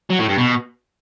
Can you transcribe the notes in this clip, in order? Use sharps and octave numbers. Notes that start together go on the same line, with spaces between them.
F#3
A2
G2
B2